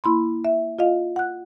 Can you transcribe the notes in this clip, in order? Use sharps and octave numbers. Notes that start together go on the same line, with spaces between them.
A#3 E4 B5 C6
E5
F4 D#5 F5
F#5 F#6